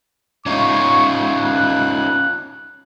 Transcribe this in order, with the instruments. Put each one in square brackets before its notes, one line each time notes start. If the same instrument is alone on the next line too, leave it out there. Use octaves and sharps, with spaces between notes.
[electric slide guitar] C#4 D#4 F4 [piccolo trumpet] C#6
[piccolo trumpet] F#6